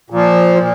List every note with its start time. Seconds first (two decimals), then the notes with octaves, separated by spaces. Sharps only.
0.10 A#2 F3
0.59 A#2